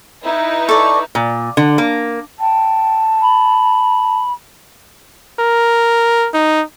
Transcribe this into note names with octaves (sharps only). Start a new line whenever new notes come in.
D#4 E4 B4
A4 D5 C#6
A#2
D3
A#3
G5 A5
B5
A#4
D#4